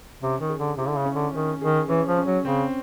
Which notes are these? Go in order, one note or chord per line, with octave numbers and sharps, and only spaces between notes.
C3 C#4
D#3
G#4
D3
C3 E4
D3
C#3
C#4
D3
D#3 C#4
D#3 G#4
E3 C#4
F3
C#4
F#3
C#3 C4